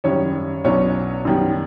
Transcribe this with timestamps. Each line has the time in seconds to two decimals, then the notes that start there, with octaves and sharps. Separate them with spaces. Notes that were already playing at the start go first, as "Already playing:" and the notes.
0.04 G#1 F#2 D#3 G3 C#4 C#5
0.64 B1 B2 F#3 B3 C#4 D4 C#5
1.25 F#2 D#3 G3 B3